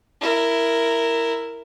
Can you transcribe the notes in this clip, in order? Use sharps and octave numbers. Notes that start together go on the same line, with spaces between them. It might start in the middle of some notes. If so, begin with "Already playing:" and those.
E4 A#4